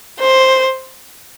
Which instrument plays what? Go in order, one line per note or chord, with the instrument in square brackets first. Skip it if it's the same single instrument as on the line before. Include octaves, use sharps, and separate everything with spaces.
[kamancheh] C5